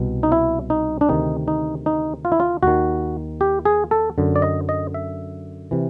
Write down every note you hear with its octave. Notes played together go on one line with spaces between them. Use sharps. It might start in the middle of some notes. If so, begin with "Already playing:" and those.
Already playing: C2 B2
D#4
E4
D#4
D4
D2 C3 D#3 D#4
D#4
D#4
F4
E4
F4
D#2 D#3 F#4
G4
G#4
A4
F#2 D3
D5
D#5
D#5
E5
C3 E3